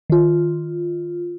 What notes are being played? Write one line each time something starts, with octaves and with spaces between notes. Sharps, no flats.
D#3 F4